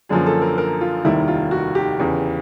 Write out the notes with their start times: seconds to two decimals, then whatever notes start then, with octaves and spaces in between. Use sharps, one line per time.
0.09 F#2 D3 F3 A#3 C#4 G#4
0.26 A4
0.42 A#4
0.58 A#4
0.81 F4
1.05 F1 D#2 D#3 G3 E4
1.28 F4
1.51 F#4
1.75 G4
1.99 E2 C#3 E3